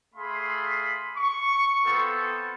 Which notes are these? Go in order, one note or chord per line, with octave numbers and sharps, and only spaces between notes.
A3 G#4 F5 B5 C6
C#6
B3 C4 F4 A4